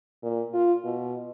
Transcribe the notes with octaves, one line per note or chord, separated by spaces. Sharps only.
A#2
F4
B2